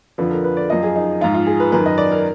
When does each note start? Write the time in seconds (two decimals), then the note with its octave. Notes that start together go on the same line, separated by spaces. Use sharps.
0.18 F2 D3 F3 B4
0.31 A#4
0.44 B4
0.57 D5
0.70 F#2 F3 D#5
0.83 G#4
0.96 D#4
1.21 G#2 F3 F4
1.35 F4
1.47 G#4
1.60 B4
1.72 F#2 D#3 B4
1.86 D#5
1.98 D5
2.11 A#4